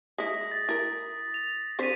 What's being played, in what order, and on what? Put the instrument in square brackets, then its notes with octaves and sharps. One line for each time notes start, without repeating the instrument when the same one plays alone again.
[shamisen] G#3 E4 [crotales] D#6 A#6 B6
[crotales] A6
[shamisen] E4 A#4
[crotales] F7
[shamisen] D3 C4 C5 [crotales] A6 B6 D#7